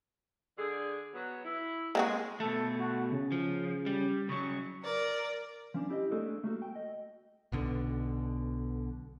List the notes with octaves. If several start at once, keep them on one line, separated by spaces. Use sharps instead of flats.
D3 G#4
F#3 B3
E4
G#3 A#3 C4 F#4
B2 A3 A4
F#4
C#3
F3
G3
C#3 F#3 C#6
A#4 D5
F3 C#4 D4
E4 G4 D5 D#5
A3 A#3 C4 D4 G#4 A4
A3 A#3 F#4 A4
G5
D#5
B1 B2 D3